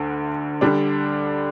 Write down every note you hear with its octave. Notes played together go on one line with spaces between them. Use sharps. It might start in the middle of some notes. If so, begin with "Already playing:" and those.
Already playing: D2 D3
D3 G3 D4